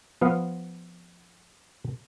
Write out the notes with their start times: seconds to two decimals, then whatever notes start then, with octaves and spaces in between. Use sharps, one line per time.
0.21 F3 B3 F5